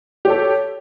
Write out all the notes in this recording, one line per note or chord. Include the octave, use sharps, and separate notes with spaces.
G4 A4 C#5